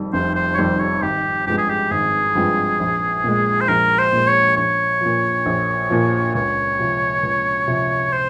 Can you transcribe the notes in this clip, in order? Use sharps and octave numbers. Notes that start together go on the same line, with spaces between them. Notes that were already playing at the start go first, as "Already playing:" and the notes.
Already playing: F1 F2 D#3 G3
F1 C5
C5
C#5
F2 D#3 G3 C5
C#5
G#1 G4
G2 F3 G#3 C4 G4
G#4
G4
G#1 G#4
G2 F3 G#3 C4
A#1
A#2 G#3
C5
A#1 A#4
C5
A#2 G#3
C#5
A#1 C#5
A#2 F3
A#1
A#2 F3
C#2 C#5
C3 F3
C#2
C3 F3
C5